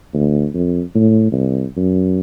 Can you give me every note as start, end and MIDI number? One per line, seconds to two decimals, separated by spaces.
0.14 0.46 38
0.54 0.81 41
0.95 1.28 45
1.32 1.65 36
1.77 2.21 42